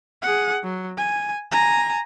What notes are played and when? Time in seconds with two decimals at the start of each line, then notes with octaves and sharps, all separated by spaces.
0.22 G#4 F#5
0.63 F#3
0.97 G#5
1.52 G#5 A#5